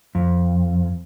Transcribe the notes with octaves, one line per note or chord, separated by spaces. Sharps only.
F2